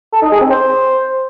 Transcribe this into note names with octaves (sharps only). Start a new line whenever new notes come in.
A4
D#4
G#4
C4
C5